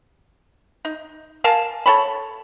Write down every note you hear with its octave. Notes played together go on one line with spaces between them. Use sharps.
D#4
A#4 F5 G#5 A5
A4 C#5 A5 B5